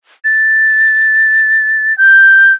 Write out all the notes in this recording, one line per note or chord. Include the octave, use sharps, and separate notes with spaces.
A6
G6